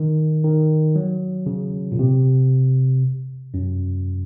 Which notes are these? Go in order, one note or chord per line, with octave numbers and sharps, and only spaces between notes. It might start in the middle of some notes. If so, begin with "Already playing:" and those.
Already playing: D#3
D#3
F#3
C#3
A#2
C3
F#2